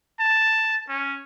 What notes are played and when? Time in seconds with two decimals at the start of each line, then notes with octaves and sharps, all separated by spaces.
0.20 A5
0.89 C#4